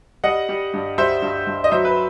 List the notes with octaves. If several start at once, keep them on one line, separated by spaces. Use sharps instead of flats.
G3 D#5 F#5
G3
G2
G3 C5 E5
G2
G2
D#5
F#3 C5 E5
B4